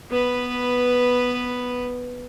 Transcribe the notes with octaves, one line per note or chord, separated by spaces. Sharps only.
B3 B4